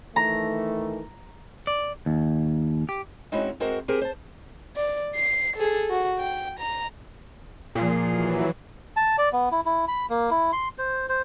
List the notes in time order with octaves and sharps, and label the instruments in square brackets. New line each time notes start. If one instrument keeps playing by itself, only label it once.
[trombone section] D#3 E3 A3 [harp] A#5
[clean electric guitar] D5
D#2
G4
[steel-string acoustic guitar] G#3 C4 C#4 D#4 E4 F#4
G#3 C4 F#4 A#4 C5
C4 G4 G#4 A#4 C5
C5 A5
[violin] D5
C7
G#4 A4
F#4
G5
A#5
[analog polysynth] A#2 [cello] F3 G#4
[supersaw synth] E3 F#3
[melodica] A5
D5
B3
E4
E4
B5
A#3
E4
C6
C5
C5